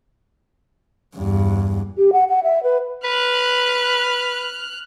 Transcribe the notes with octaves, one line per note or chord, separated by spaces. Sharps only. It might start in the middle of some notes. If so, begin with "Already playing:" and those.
E2 G2
G4
F#5
F#5
E5
B4
B4 F6 F#6